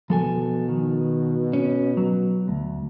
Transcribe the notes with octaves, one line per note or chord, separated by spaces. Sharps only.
B2 F3 A4 G#5
D#3
C#4
F#3
D2